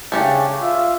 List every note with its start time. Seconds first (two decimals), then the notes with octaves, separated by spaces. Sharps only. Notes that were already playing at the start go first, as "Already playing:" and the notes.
0.12 C#3 A3 C#4 D4 G4
0.61 F4 E5